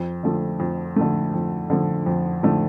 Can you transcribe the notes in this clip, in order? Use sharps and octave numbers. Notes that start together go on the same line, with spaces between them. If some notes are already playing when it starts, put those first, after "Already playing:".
Already playing: F2
D3 F3 A3
F2
D3 F3 A3
F2
D3 F3 A3
F2
D3 F3 A3